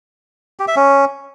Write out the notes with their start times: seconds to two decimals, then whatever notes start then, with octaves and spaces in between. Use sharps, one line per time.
0.59 G4
0.68 E5
0.76 C#4